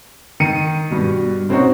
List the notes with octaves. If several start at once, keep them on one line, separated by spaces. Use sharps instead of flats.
D#3 C#7 D#7
G2 B2
B2 C4 C#4 D#4 F#4